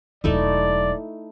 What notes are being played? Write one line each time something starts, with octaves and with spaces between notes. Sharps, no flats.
E1 F#3 A3 D#4 E4 D5